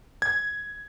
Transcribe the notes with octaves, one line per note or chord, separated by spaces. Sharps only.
G#6